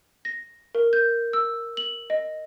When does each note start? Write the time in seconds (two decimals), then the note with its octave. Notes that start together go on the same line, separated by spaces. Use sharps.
0.25 A#6
0.75 A#4
0.93 G6
1.33 E6
1.77 F#7
2.10 D#5